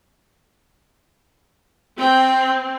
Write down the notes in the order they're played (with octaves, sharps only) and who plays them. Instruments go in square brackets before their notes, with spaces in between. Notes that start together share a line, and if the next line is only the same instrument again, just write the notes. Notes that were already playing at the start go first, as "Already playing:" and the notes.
[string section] C4 [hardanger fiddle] G5